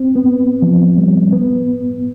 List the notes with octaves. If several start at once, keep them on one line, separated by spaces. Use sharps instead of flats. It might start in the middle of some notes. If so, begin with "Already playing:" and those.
Already playing: C4
B3
F3
G3
B3